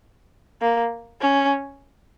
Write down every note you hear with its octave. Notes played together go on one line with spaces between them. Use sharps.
A#3
C#4